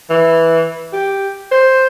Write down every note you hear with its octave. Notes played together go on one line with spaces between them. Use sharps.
E3
G4
C5